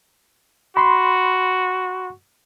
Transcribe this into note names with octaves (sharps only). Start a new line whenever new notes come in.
F#4 B5 C6